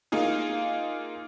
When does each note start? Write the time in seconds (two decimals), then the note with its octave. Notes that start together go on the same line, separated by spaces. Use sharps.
0.12 A#3 D#4 F4 G#4